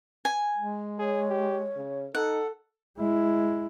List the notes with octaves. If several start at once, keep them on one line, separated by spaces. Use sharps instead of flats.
G#5
G#3
G#4 C#5
G4
C#3
D#4 A4 F#5
G#3 E4